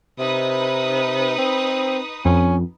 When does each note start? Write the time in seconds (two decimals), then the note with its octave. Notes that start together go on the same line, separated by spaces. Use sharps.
0.19 C3 D#4 B4 D#6
1.38 C4
2.25 F2 C#4